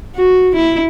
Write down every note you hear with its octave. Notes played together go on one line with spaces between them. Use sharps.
F#4
E4